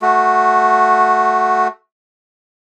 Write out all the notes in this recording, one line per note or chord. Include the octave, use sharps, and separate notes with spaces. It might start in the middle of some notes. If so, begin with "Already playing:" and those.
A3 F#4